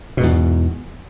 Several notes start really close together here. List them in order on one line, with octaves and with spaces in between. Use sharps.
B2 G#2 E2